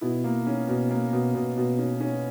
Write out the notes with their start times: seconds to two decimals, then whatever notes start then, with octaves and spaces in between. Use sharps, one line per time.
0.01 B2 E4
0.24 A#3
0.47 C#4
0.68 B2
0.91 A#3
1.13 B2
1.34 B2
1.57 B2
1.79 C#4
2.01 C#4